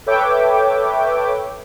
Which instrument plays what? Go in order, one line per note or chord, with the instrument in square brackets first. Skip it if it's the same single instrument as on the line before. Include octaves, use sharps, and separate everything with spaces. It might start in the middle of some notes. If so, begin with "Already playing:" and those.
[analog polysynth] A4 B4 C#5 E5 G5 D6